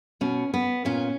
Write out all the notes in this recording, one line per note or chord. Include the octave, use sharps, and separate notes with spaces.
B2 C#4
B3
A#2 C#4